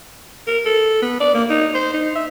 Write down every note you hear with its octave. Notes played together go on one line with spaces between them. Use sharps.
A#4
A4
B3
D5
A#3
D#4
C5
D#4
E5